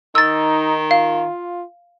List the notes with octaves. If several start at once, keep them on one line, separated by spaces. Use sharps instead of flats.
D#3 D#4 E6 A6
F4 F5